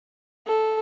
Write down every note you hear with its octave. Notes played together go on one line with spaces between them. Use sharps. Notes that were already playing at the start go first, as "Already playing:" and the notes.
A4